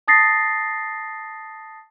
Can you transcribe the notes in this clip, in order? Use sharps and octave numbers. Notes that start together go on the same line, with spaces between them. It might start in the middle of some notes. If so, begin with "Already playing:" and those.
A5 D#6 A6 A#6 C7